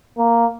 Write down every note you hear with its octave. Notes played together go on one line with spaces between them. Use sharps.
A#3